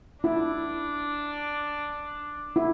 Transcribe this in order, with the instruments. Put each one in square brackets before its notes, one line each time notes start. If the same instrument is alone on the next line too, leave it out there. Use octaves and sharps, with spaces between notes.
[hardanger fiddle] D4 [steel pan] E4
[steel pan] E4